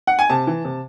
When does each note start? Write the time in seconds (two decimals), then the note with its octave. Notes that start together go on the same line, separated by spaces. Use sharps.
0.07 F#5
0.19 G#5
0.30 C3 A5
0.47 E3
0.65 C3